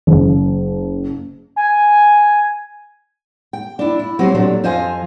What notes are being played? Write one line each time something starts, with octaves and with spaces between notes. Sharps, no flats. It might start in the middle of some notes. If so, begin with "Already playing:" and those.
F#1
G#5
G5
D4 E4
E4
F#3 C4 G4 C5
A#2 F#3 A3 D4
F2 F3 C5 D#5 F5 G#5